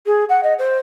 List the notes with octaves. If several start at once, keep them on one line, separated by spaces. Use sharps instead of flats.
G#4
F#5
D#5
C5